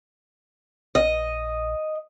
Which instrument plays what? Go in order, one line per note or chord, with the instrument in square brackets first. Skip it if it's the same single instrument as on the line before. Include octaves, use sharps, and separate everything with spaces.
[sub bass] A#1 [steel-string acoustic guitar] D#5